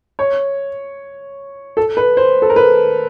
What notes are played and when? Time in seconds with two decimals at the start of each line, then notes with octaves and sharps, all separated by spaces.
0.19 C#5
1.77 A4
1.97 B4
2.17 C5
2.42 A4
2.50 A#4
2.56 B4